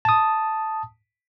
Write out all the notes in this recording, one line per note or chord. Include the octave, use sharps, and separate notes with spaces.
A5 D#6